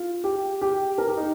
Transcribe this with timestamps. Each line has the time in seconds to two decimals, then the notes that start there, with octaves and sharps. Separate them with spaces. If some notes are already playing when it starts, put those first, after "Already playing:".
Already playing: F4
0.24 G4
0.62 G4
0.98 A#4
1.08 G4
1.17 D#4